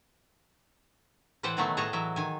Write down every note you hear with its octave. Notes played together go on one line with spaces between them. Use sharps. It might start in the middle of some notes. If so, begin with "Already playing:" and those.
A2 E3 B4 C5 F#5 G5
B2 D#3 F#3 A3 B3
A2 G#4 C#5 D#5 A5 A#5
E3 F#3 E5
D#3 G#5